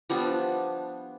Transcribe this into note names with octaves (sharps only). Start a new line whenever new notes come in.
F3 G3 B3 D4